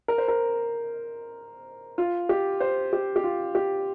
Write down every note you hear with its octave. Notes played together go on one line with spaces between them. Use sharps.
A#4
C5
A#4
F4
G4
C5
G4
G4
F4
G4